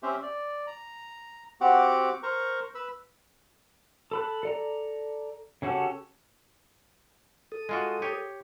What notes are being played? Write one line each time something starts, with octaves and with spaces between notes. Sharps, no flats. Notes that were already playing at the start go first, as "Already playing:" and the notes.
C4 C#4 G4 C5 E5
D5
A#5
C4 F#4 G4 F#5 D6
A#4 C5 A#5 C#6
B4 B5 E6
A4 B5 F#6
A4 D5 A#5
C#3 C#4 F#4 G4 A4
A4 D#6
G#3 F4 F#4
G4 C#5